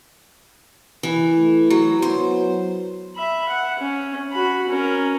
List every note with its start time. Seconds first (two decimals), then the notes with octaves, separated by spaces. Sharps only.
1.03 E3
1.37 A3
1.70 F#3
2.02 F#3 B3 C5
3.15 E5 B5
3.49 F#5
3.79 C#4
4.32 F#4 B5
4.69 C#4 A#4